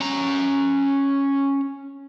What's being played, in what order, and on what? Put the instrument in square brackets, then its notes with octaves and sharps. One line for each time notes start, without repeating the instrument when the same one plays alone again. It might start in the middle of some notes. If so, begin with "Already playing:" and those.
[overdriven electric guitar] C#4 A#5